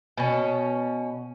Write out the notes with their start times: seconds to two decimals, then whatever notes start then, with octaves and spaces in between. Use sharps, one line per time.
0.17 B2 C#4